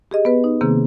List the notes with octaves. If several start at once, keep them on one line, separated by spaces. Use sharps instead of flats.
G4 G#4 D#5
B3 B4
D#4
C3 D#3 A#3 C4 G#4